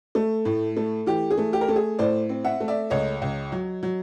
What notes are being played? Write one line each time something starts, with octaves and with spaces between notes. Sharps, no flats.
A3
A2
A3
E3 G4
G#4
A3
G4
A#4
A3 A4
G#4
A2 C5 D5
C4
E5 F#5
A3
D5 E5
C#2 C#5 D#5
C#2
F#3
F#3